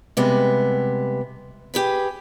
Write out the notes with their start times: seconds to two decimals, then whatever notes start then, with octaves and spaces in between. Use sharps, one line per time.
0.17 C3 G3 G#3 B3
1.74 G4 G#4 B4